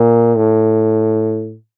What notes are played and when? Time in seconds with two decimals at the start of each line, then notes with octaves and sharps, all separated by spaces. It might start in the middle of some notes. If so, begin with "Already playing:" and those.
Already playing: A#2
0.37 A2